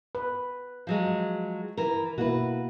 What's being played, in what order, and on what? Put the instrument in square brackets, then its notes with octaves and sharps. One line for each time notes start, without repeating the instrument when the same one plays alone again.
[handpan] B4
[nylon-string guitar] F3 F#3 G#3
E3 A#4
[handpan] B2 A#3 E4 [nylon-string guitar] F#4 B4